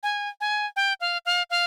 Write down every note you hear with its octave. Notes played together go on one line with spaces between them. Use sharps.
G#5
G#5
G5
F5
F5
F5